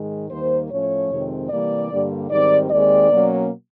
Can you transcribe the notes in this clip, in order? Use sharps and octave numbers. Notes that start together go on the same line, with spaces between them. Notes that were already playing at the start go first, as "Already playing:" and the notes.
Already playing: G#2 D#3 G#3
D#2 D#3 G3 A#3 C5
A2 F3 A3 C#4 C#5
F2 C3 D#3 G#3 C4
C3 E3 G3 A#3 D5
G2 D3 G3 A#3
G#2 D#3 G3 C4 D5
D#2 D#3 G#3 C4 D5
B2 F#3 A#3 C#4